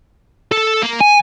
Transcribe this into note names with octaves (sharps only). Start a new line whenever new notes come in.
A4
A#3
G#5